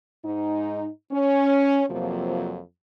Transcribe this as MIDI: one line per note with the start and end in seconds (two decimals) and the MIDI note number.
0.24 0.87 44
0.24 0.87 63
1.12 1.85 61
1.90 2.60 41
1.90 2.60 48
1.90 2.60 53
1.90 2.60 54
1.90 2.60 58